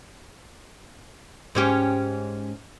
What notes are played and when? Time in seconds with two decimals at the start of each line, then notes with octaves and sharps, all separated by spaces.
1.55 G#2 C#4 G4